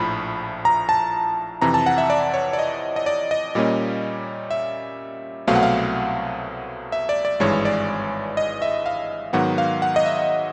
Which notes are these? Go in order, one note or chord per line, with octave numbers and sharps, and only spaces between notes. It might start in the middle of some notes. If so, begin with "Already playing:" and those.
Already playing: A#1 A2 F3 B5
A#5
A5
F2 C3 E3 A#5
A5
F#5
E5
D5
C#5
D5
D#5
D#5
D5
D#5
A#2 G3 A#3 C#4
E5
C2 B2 F#3 A3 C4 F5
F#5
F5
E5
D5
D5
G#1 G2 E3 G#3 C#5
D5
D#5
E5
F5
G#2 D#3 F#3 B3 F#5
F5
F#5
D#5
E5